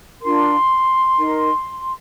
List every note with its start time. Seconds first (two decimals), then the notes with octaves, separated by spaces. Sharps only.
0.22 D4 F4 A#4 C6
1.17 D#4 A#4